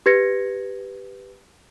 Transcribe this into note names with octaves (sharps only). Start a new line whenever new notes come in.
G4 B4 G#6 A#6 C#7